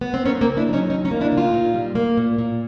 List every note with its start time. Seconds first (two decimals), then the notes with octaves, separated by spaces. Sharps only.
0.01 B3
0.14 C4
0.25 A#3 B3 C#4
0.41 A#3 C4
0.47 C#3
0.57 D4 E4
0.69 F#3 C#4 D#4
0.89 D#2 C#4 D#4
1.05 C#4 D#4
1.11 A#3
1.21 D4 E4
1.32 C#3
1.37 D#4 F4
1.54 A#2
1.74 G3
1.95 A#3
2.17 A#2
2.38 A#2